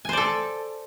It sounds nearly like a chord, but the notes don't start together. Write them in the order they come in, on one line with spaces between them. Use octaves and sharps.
G#5 C5 D5 A4